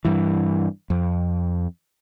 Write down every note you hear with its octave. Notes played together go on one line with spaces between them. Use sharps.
G2 E3
F2